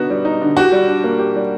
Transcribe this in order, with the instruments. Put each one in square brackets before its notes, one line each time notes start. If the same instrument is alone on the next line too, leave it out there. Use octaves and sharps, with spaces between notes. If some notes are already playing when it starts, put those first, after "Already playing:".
Already playing: [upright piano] D3 B3 D#4 [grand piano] F#4
[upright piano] G3
D#4
D3
[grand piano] F#4 [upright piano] G4
[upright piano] G3
D4
A#3
G4
G3